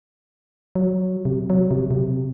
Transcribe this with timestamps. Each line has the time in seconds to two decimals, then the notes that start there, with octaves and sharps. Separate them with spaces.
0.75 F#3
1.25 C3
1.50 F#3
1.71 C3
1.91 C3